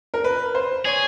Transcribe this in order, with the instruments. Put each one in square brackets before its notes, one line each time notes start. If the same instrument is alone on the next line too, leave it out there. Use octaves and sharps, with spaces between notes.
[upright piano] A#4
B4
C5
[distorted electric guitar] G#4 [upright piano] C#5